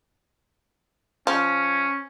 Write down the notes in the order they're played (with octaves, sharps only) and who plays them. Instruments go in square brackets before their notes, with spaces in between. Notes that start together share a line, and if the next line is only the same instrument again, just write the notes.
[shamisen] F3 [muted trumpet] C#4